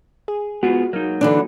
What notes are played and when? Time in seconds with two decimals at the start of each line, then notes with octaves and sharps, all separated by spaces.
0.28 G#4
0.63 G#3 B3 F4 F#4 G#4
0.93 F#3 A#3 D#4
1.21 D3 E3 D4